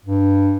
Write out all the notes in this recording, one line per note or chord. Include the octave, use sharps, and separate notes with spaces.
G2